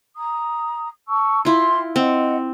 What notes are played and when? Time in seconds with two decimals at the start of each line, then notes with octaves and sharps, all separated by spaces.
0.16 A#5 D#6
1.08 A5 C#6 E6
1.45 E4 F4 G5 C6
1.96 C4 D#5 F#5 G5